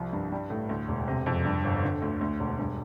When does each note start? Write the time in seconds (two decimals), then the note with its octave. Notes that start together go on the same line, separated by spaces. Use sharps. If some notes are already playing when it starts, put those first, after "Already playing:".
Already playing: C2 F3
0.13 G2
0.32 G3
0.50 A2
0.69 D2
0.88 E1
1.08 C3
1.26 F2
1.45 G2
1.64 G1
1.83 D3
2.02 D2
2.21 D2
2.40 E1
2.58 G2